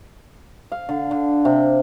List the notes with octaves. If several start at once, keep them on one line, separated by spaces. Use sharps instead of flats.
F5
D3
D3
C3